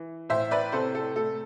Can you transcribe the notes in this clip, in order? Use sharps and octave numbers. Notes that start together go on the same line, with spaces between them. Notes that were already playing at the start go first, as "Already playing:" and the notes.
Already playing: E3
A2 C5 E5
B4 D5
C3 A4 C5
A4
A3 A4